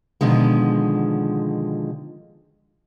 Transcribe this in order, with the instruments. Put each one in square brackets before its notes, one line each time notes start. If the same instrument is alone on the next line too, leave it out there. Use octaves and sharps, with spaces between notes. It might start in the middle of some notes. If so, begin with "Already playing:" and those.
[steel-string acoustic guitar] B2 D3 D#3 F3 G#3